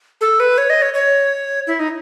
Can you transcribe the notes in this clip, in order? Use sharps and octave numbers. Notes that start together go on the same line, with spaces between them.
A4
B4
C#5
D#5
C#5
C#5
E4
D#4